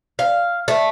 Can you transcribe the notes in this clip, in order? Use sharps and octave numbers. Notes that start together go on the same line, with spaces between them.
F5
A3